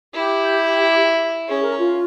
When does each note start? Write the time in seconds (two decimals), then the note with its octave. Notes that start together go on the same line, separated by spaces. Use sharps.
0.13 E4 G4
1.48 C#4 G#4
1.63 A#4
1.78 F4